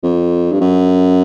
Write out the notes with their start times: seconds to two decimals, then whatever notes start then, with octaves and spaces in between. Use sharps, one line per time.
0.03 F2
0.52 G2
0.60 F#2